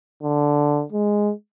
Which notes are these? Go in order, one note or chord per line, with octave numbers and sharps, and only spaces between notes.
D3
G#3